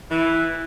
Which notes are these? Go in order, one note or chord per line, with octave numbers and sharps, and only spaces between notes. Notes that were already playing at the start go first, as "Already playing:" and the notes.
E3